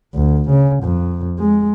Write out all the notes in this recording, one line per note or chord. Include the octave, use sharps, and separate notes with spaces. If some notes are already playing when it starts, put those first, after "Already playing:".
D2
C#3
F2
G#3